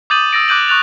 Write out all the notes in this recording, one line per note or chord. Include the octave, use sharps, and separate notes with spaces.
D6 D#6 G6 A6 D#7 F#7
D#6 E6 A6 A#6 D7
D6 F#6 G6 D#7 F#7
C#6 F#6 A6 F7